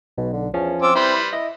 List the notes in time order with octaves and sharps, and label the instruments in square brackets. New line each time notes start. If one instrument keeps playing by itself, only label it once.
[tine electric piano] B1 [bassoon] B2
[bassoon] D3
[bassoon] E2 [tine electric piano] F3 C#4
[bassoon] C4 [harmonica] F4 D6 E6
[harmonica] G3 B4 C5 [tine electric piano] E4
[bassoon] E4 [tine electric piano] D#5